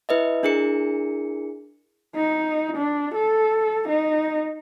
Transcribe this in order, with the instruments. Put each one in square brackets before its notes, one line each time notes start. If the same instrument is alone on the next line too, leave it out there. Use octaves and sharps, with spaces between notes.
[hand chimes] E4 B4 D#5 E5
D4 E4 G#4 A#4 C#7
[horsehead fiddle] D#4
D4
A4
D#4